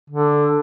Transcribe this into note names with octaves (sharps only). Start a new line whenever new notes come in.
D3